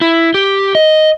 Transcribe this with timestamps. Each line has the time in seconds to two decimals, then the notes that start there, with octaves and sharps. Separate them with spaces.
0.01 E4
0.34 G4
0.75 D#5